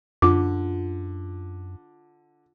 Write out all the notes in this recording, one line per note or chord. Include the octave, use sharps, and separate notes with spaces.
F#2 D3 F4 D6